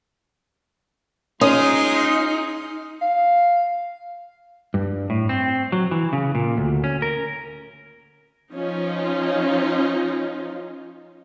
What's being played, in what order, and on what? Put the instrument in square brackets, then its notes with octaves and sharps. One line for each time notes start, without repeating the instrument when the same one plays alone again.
[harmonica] G#3 F4 C6 [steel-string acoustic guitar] C#4 [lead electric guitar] D#4 [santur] D#6
[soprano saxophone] F5
[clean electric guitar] G2
A2
C4
F#3
E3
C#3
A#2
D2
C#4
A#4
[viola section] F3 C#4 D#4 F4